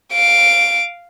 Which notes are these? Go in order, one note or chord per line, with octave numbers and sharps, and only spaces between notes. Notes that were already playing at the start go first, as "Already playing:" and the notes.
F5 D7